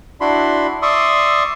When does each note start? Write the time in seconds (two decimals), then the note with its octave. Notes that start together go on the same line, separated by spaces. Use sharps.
0.21 D4 E4 F#4 B5 C6
0.82 D5 E5 C6 C#6 D#6